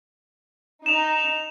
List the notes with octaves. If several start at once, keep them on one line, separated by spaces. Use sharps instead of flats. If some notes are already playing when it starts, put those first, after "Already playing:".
D#4 E7 F7